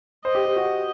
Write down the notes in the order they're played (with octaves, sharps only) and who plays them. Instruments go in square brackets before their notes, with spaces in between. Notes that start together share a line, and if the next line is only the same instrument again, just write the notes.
[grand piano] C5 [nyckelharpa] D#5
[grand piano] G4
G4
F#4